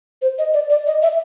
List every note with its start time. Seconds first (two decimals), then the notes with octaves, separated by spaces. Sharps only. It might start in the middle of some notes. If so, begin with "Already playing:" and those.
0.22 C5
0.38 D#5
0.54 D5
0.70 D5
0.87 D#5
1.02 E5